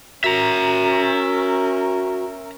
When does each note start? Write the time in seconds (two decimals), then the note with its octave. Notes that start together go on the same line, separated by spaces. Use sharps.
0.24 C#4 F#4 A#4 E5 A#5